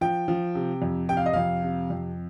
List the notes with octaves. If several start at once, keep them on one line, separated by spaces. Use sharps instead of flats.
F3 G5
F3
C3
F2
C3 G5
F5
D#5
F2 F5
C3
F2